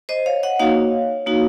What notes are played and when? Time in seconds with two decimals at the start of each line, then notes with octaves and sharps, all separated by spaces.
0.09 C5 D#5
0.26 C#5 F5
0.43 D#5 F#5
0.59 A#3 D#4 F#4 C#5 F5
1.26 A#3 D#4 F#4